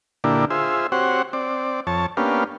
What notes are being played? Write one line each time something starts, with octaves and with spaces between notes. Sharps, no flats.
A#2 D3 A#3 D4 E4 G4
F4 G#4 C5 E5
C4 F#4 G4 C5 C#5 F#5
C4 D5
F2 C#5 A5
A#3 B3 C#4 D4 G4 F5